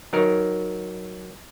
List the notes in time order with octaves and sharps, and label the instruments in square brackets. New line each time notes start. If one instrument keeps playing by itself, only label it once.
[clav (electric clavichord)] F#3 D#4 A#4